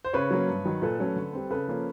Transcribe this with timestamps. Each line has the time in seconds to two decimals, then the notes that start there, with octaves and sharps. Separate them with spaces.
0.04 C5
0.13 C#3 B4 C#5
0.31 F#3 A#3 C#4
0.48 G2
0.65 D#3 F#3
0.82 A#2 A4 B4
1.00 F#3 A3 C#4
1.16 D3
1.33 G3 C4
1.51 C#3 A4 B4
1.68 F3 A#3 C#4